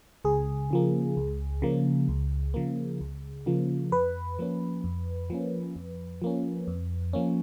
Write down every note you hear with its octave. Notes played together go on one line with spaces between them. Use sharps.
C#2 G#4
C#3 F3 A#3
C#2
C#3 F3 A#3
C#2
C#3 F3 A#3
C#2
C#3 F3 A#3
F2 B4
F3 A#3 C#4
F2
F3 A#3 C#4
F2
F3 A#3 C#4
F2
F3 A#3 C#4